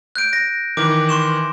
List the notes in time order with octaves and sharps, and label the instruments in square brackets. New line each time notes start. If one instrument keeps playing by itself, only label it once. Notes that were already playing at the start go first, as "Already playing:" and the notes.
[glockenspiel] F#6 G6 D7
A#6
[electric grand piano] D#3 E3 B4 [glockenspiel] D6
[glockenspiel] C6 C#6 E7